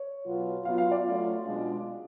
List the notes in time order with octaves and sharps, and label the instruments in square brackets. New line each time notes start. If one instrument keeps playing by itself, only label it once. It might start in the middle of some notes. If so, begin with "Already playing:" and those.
Already playing: [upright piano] C#5
[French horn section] B2 F#3 B3 F4
[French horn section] F#3 B3 F4 [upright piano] F5
[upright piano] F5
D5
[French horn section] F#3 A3 C#4 F4
B2 G#3 D4 F4